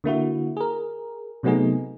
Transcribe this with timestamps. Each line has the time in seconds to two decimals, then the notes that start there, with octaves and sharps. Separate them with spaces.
0.04 D3 A#3 E4 F#4
0.57 G#4 A#4
1.43 C3 F#3 A3 B3 D#4 G#4